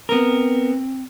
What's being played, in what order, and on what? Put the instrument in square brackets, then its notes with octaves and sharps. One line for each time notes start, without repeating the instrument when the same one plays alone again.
[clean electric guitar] B3 A#4 [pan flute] C4